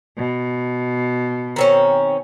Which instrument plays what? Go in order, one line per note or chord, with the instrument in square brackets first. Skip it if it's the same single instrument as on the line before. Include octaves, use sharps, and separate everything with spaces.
[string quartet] B2
[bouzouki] D#3 C4 C#4